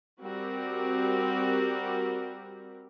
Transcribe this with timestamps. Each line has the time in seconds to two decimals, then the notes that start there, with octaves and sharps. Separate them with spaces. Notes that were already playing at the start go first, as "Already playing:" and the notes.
0.22 G3 C4 F#4 G4 A#4